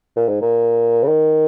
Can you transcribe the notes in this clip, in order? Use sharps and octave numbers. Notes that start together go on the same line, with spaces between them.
A#2
G#2
A#2
C#3
D#3